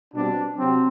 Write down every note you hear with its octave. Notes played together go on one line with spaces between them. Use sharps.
B2 G3 C4 D4
C3 F#3 C4